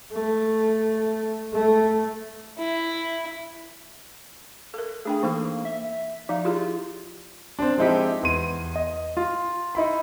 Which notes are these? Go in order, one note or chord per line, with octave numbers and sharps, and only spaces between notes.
A3
A3
E4
A4 A#4
A3 D4 G#4 G5
E3 A#3 D#4 A4
E5
F3 D#4 F5
E4 F4 G4 G#4
C4 D4
F3 G#3 C4 D#4 E4 G4
E2 C6 D#7
D#5
F4
D#4 E4 B5